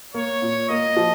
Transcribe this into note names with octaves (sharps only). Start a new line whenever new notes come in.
A#3 C#5
A#2
A#3 D#5
F3